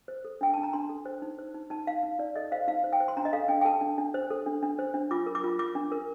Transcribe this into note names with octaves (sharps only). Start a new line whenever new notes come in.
C5
A4
D4 G5
D4 A5
A#5
D4 C6
A4
C5
D#4
C5
D#4
D#4 A5
D#4 F5
D#4
D#4 D5
A4 D#5
C5 F5
D#4 F5
C5
G5
C5
C6
D4 A#5
D#5
A4 F5
D4 G5
G5
A4 A5
D4
D4
C5
A4
D4
D4
C5
D4
F4 D6
A#4
D6
F4
F4 D6
D4
A#4